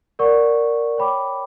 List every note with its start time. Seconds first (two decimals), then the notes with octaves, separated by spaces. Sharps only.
0.19 A#4 D5 F#5 C#6
0.98 C#5 G5 B5 D6